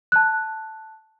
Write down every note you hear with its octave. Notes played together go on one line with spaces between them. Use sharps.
A5 F#6